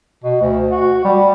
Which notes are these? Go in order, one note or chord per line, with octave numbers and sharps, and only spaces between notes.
B2
D2
F#4
G3